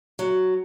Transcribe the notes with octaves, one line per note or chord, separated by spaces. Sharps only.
F#3